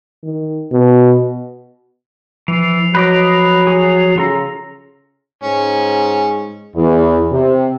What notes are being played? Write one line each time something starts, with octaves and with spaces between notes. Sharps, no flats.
D#3
B2
E3 F3
F#3 B4 D#5 D6
F#4 G#4
C#3 F4 A4 A#5
G#2 C#4
E2
C3